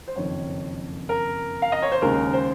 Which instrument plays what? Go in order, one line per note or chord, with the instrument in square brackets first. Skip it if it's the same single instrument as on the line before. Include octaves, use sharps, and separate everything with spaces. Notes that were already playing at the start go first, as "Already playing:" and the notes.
[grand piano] C5
F#1 F2 D#3 C#5
A#4
F5
D#5
C#5
C5
D#2 C#3 G#3 A#4
C5